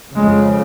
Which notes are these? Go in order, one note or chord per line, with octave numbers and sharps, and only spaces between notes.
F2 C#3 G#3